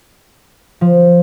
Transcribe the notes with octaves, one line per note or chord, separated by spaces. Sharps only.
F3